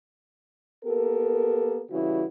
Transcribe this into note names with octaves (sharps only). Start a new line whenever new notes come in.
A#3 B3 G4 A4 A#4
C#3 E3 G3 E4 F#4